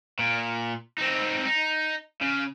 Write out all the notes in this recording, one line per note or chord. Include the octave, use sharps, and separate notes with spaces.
A#2
C4 D#4
D#4
C#3